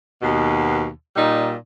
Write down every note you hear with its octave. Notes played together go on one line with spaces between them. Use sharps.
D#2 B2
A#2 G3 D#4